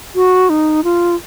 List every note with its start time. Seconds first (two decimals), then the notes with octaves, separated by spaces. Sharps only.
0.15 F#4
0.50 D#4
0.84 F4